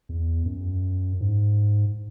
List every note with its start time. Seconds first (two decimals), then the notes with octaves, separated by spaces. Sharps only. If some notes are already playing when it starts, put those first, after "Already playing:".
0.09 E2
0.46 F#2
1.21 G#2